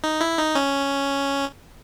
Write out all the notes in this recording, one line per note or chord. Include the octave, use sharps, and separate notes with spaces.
D#4
E4
D#4
C#4